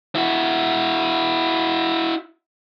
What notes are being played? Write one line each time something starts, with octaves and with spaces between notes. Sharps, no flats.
E4 F#4